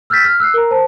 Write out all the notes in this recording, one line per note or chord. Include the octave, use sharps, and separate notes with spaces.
E6 F6 G6 A6 B6
F6
E6 F#6 C7
A#4 A#5
C5 A5